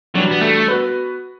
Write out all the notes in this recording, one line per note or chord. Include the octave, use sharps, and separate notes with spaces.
E3 F#3 G3 D4 F#4
B3
A3
B3 F#4 B4